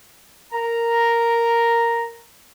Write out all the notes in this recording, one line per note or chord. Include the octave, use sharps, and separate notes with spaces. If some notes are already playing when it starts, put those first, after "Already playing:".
A#4 A#5